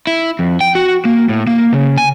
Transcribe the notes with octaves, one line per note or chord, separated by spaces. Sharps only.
E4
F2
G5
F#4
A#3
A2
A#3
C#3
G#5